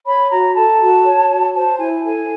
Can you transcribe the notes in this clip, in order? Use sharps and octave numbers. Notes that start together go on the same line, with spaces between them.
C#5 B5
F#4 A#5
A4 A5
F#4
C#5
F#4
C5 A5
E4 G#5
A4 G#5